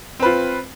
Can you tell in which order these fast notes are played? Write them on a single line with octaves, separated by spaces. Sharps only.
C4 B4 F4